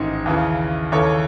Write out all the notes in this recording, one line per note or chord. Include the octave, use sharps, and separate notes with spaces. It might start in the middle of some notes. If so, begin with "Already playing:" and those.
Already playing: A1 G#2 D#3 D#5
D#2 C#3 E3
D#2 C#3 E3 A4 C#5